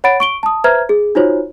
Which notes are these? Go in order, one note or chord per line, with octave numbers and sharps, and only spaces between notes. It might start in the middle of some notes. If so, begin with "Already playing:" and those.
C#5 F#5 B5 A6 D7
C#6 D7 G7
A5 D#6
B4 C5 E5 A#5 F6 G#6
G#4
D#4 F4 F#4 C5 C#5